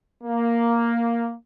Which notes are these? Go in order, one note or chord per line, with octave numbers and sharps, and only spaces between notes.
A#3